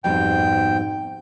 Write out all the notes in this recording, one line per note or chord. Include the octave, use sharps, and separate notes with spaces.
F2 G#2 B2 G3 G5